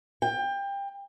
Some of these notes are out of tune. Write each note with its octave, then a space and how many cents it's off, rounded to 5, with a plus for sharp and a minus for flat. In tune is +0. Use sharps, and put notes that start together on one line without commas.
G5 +25